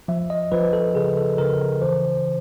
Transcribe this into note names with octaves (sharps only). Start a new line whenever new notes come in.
F3 E5
D#5
F3 B4
A4
C#3 G#4
A4
C#3 A#4
E3 C5